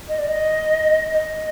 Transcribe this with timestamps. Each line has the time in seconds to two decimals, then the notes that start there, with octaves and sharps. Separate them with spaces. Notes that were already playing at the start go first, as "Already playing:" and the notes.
0.09 D#5
0.19 D5
0.28 D#5
1.13 D#5